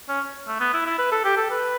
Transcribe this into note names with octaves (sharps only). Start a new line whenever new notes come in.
C#4
A3
B3
E4
E4
B4
A4
G4
A4
B4